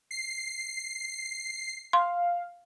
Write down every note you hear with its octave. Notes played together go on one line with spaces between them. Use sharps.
C7
F5 C6